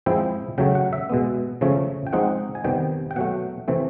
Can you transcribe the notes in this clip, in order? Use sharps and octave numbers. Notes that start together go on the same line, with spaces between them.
F3 G#3 C4 E4 G5
C#3 F#3 A3 G5
F#5
E5
B2 G#3 B3
C#3 F3 A3 C#4
G5
F3 G#3 C4 D#4 F#5
G#5
C3 D#3 G3 B3 G5
G5
B2 F#3 A3 F#5
C3 E3 A3 C4